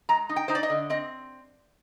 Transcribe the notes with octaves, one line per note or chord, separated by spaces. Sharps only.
G#3 A#5
D#4
G5
D#4 C5
D5
D#5
D3
C4 D#5